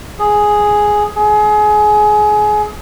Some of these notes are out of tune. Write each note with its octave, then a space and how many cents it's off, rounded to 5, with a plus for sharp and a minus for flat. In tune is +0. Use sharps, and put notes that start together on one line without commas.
G#4 +5
G#4 +25